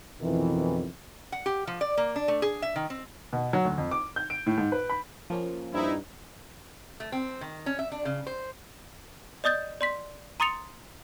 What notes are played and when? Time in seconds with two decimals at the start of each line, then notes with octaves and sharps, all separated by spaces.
0.21 F2 B2 D#3 E3
1.32 F#5
1.46 G4
1.67 F3
1.81 D5
1.97 A#3
2.16 D4
2.28 A3
2.42 G#4
2.62 E5
2.76 D#3
2.90 C4
3.33 B2
3.53 F#3
3.65 D2
3.78 F2
3.91 D6
4.16 G6
4.30 D7
4.47 A2
4.58 G#2
4.72 B4
4.90 B5
5.30 F3 A#3 C#4
5.73 G2 C4 D#4 E4
7.00 A3
7.12 C4
7.41 D#3
7.66 C#4
7.79 E5
7.92 D4
8.05 C#3
8.27 C5
9.44 D5 D#5 D#6 G6 A6
9.81 D5 C6 B6
10.40 A#5 C6 D#6 A6 C#7 F7